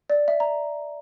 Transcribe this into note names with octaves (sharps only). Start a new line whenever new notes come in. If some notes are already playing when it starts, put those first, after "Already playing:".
D5
E5
A#5